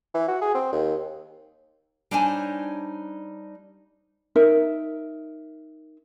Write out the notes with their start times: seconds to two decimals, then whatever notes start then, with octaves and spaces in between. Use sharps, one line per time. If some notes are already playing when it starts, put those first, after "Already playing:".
0.15 E3
0.28 F#4
0.42 G#4
0.55 C4
0.73 D#2
2.11 G3 D4 D#4 C5 C#5 G#5
4.36 D#4 A#4 E5